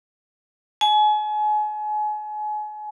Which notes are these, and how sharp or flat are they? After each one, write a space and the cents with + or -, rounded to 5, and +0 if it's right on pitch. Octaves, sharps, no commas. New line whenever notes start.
G#5 +35